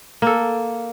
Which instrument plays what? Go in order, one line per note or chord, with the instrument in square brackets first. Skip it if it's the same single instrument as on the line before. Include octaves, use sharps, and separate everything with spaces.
[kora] A#3 A4